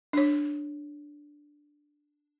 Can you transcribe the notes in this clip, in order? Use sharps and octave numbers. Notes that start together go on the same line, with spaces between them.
D4 C#5